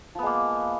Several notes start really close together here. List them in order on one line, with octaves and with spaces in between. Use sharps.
F3 B3 G#3 A#3